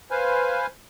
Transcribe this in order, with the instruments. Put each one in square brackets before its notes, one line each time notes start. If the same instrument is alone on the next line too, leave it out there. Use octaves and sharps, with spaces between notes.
[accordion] B4 C5 F5 G#5